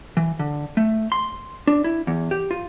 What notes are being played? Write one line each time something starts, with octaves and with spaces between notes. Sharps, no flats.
E3
D3
A3
C6
D4
E4
E2
G4
F4